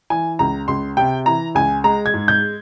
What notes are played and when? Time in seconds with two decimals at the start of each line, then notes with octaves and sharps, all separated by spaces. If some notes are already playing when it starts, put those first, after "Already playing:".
0.10 E3 G#5
0.39 C#2 A#5
0.68 C#2 C6
0.97 C3 G5
1.26 E3 A#5
1.55 C#2 G#5
1.84 G#3 A#5
2.06 G#6
2.14 G#2
2.28 G6